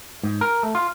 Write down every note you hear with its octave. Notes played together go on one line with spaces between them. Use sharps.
G#2
A#4
A3
F4